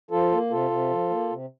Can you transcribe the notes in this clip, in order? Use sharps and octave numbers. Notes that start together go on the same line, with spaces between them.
F3 F4 A4
A#3
C3 F4 A4
C3
F3
A#3
C3